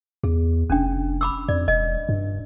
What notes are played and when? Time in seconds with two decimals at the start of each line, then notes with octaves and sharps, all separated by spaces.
0.23 E2 G#4
0.70 F1 C#4 D4 G5
1.21 B5 D6 E6
1.49 F2 D5
1.68 E1 D#5
2.09 G2